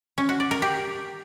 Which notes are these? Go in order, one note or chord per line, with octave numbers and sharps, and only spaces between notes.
C#4
F#4
D5
A#4
G4